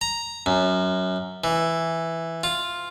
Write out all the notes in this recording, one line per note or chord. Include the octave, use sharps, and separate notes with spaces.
A#5
F#2
E3
F4